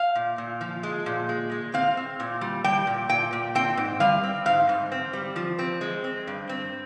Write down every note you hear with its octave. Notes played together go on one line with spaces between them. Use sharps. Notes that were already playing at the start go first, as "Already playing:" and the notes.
Already playing: F5
A#2
A#2
F3
G#3
A#2
G#3
G#3
C4 F5
C4
A#2
G3
G3 G5
A#2
A#2 G5
A#2
C4 G5
G#2
G3 F5
C4
G#2 F5
G#2
C4
G3
F3
C4
G#3
C4
G2
C4